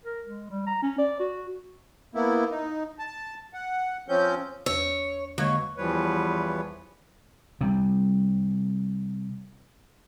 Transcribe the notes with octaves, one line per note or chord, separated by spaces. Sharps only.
A#4
G#3
G3
A#5
C#4
D5
F#4
A#3 B3 E4
D#4
A5
F#5
F3 C4 C#4 G6
E2 C#5 E6
D#2 D3 F#3 G#3 C#5 G#6
E2 E3 F3 G3 B4 C#5
C3 G3